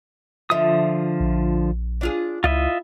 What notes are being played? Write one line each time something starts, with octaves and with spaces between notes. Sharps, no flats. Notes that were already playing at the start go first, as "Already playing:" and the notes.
D3 F3 F4 E5 D#6
A#1
D4 F4 G#4
C#2 E4 F4 D#5 E5